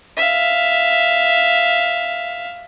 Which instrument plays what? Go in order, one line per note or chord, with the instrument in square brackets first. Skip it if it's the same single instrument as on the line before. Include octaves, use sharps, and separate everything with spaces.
[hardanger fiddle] E5 F5